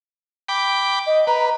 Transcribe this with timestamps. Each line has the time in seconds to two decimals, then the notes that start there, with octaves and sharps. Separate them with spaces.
0.49 G5 B5 D6
1.06 D#5
1.27 B4 A#5